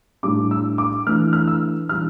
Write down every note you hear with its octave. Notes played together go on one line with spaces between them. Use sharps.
A2 G3 D4 D6
E6
D6
E3 A3 D4 F6
F6
E6
E3 G3 D4 F6